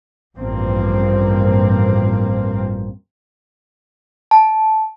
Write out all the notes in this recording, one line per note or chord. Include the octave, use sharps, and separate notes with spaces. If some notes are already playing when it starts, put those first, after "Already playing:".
A1 G2 F3 A#3 C4
A5